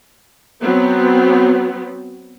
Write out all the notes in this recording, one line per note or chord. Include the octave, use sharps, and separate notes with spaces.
F#3 B3 C4